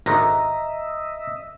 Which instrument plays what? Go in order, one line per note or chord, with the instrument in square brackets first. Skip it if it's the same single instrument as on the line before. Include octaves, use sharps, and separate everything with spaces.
[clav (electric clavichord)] G#1 D3 D#3 [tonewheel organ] D#5 E5 [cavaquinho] A#5